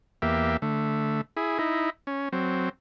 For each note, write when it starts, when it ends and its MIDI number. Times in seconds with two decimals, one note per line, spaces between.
0.22 0.57 40
0.22 0.57 58
0.22 0.57 67
0.22 0.57 76
0.62 1.21 50
0.62 1.21 57
1.37 1.58 64
1.37 1.58 68
1.59 1.90 63
1.59 1.90 64
2.07 2.29 61
2.33 2.69 54
2.33 2.69 60